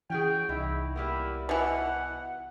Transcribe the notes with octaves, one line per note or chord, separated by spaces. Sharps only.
E3 C#4 F#4 G#4 G5
C2 D#4 E4
G3 A#3 B3 E4
B2 E3 E4 F#5